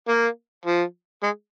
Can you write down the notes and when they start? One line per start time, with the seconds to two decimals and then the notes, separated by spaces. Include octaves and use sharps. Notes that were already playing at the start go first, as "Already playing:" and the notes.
0.09 A#3
0.66 F3
1.23 G#3